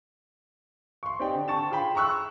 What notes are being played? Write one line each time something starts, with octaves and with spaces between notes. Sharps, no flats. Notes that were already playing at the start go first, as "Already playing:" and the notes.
C6 C#6
C4 D#4 G4 D5 D#5 G5
D3
G5 A5 C#6 A6 E7
F4 G#4 F5 G5 B5 C6
A#5 C6 C#6 E6 F#6